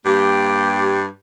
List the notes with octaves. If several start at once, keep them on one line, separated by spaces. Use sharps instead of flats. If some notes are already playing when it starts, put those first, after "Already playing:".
G2 A#3 G4